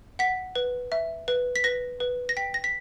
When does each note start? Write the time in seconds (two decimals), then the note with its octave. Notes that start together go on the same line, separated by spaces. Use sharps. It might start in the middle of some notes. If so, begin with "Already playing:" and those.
0.19 F#5 B6
0.55 B4
0.92 E5
1.28 B4
1.56 B6
1.64 B4 A#6
2.00 B4
2.29 A#6
2.37 G5 B6
2.54 A#6
2.64 B6